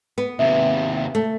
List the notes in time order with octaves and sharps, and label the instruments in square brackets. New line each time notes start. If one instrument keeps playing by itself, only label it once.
[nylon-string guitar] B3
[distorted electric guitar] D#2 C3 [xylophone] E5
[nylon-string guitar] A3